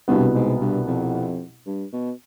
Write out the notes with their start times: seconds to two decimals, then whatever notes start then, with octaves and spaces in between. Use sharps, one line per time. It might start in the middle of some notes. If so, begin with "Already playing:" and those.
0.08 C2 G2 B2 B3
0.35 G#2
0.61 G2
0.87 F2
1.66 G2
1.93 B2